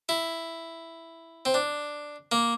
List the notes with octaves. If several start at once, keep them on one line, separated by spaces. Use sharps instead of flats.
E4
C4
D4
A#3